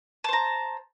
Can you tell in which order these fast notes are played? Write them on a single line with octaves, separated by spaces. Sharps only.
A5 C5 A#5